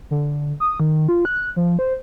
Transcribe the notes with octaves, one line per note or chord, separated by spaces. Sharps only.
D3
D#6
D#3
F4
F#6
F3
C5